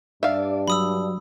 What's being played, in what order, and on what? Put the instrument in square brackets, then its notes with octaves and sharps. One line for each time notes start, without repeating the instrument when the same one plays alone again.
[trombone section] G2 D4 [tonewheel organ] D5 [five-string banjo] E5 F5
[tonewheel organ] F#3 [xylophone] B5 D#6 E6